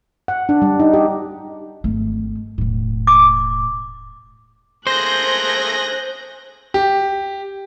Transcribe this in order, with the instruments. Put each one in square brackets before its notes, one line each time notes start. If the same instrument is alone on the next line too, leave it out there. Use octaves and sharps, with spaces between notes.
[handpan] F#5
D4
G3
D#4
G4
[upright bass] G#1 A3
E1 A2
[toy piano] D6
[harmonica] A3 A#3 G#4 [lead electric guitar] C5 [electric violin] F#6 G6 [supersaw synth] A#6
[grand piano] G4